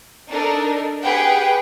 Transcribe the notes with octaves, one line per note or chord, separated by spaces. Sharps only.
D4 D#4 A4 A#4
G4 G#4 B4 F#5 G5